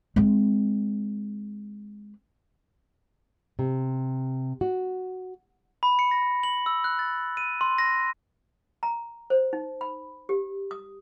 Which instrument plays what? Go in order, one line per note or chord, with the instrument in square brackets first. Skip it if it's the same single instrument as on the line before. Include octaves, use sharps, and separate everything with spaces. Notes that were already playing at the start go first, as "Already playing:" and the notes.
[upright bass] G#3 C4
[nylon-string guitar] C3
F#4
[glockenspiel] B5
C#7
A#6
F#7
E6
F#6
A6
D#7
C6
A#6
[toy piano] A#5
C5
D#4
B5
G4
D#6